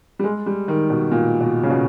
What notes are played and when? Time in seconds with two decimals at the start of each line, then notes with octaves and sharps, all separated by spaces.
0.19 G3
0.24 G#3
0.46 G3
0.68 D#3
0.90 B2
1.11 A#2
1.41 B2
1.63 C#3
1.70 B2